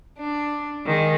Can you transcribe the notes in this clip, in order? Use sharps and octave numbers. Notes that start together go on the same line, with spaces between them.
D4
D#3 G#3